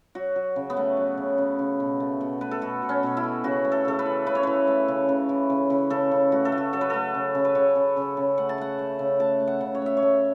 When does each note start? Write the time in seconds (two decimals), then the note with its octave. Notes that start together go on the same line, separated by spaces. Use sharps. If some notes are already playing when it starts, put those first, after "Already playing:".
0.15 F#3 F#4
0.36 F#3
0.56 C#3
0.70 B3
0.77 A3
0.97 F#3
1.18 C#3
1.38 C#3
1.59 C#3
1.80 B2
2.00 A3
2.21 B2
2.41 A3 B4
2.51 A4
2.61 B2 F#4
2.82 B2
2.89 C#4
3.03 B2
3.17 E4
3.24 A3
3.44 C#3 F#4
3.65 A3
3.72 A4
3.85 C#3 A4
3.99 B4
4.06 E3
4.26 C#3 B4
4.35 C#5
4.43 E3 B4
4.67 A3
4.88 C#3
5.09 C#3
5.29 E3
5.50 C#3
5.70 C#3
5.90 C#3 A4
6.11 C#3
6.32 A3 F#4
6.45 A4
6.52 A3
6.58 F#4
6.73 F#3 A4
6.81 B4
6.90 A3 A4
7.14 C#3
7.35 C#3
7.45 B4
7.55 C#3 C#5
7.75 C#3
7.96 C#3
8.17 C#3
8.38 A3 F#5
8.49 A5
8.58 A3 F#5
8.79 A3
8.99 C#3
9.20 A3 A5
9.40 A3
9.48 F#5
9.61 C#3
9.75 C#5
9.82 A3 E5
9.97 C#5
10.02 A3